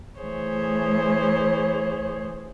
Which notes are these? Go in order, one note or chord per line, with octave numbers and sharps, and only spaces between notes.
E3 A3 G#4 C5 C#5